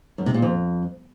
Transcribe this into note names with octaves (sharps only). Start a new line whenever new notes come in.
F#2
C3
A#2
F2